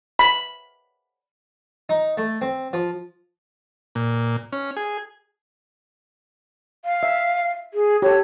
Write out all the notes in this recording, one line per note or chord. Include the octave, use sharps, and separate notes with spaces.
B5
D#4
A3
C4
F3
A#2
C#4
G#4
F5
E5
G#4
G4 A4 C#5